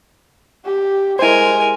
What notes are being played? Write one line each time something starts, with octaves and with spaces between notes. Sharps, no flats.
G4
G#3 E4 A#4 C5 G#5